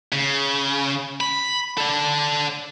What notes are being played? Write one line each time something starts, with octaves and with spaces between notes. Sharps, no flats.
C#3
B5
A4 D5